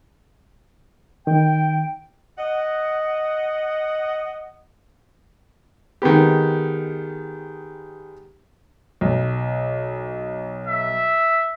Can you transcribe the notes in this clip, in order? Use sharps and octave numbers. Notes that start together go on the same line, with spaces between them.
D#3 G5
D#5 F#5
D#3 G#3 B3 G4
B1
E5